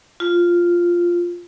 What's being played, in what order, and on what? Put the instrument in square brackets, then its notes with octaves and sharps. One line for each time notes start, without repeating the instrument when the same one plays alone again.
[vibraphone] F4